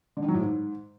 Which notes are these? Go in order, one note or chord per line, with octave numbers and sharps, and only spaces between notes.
D3
D#3
F#3
A2
G#2